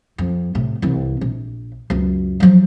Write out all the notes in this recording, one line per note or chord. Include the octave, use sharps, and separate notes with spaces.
F2
A2 C3
C2 E3
A#1
C#2 F#2
F3 F#3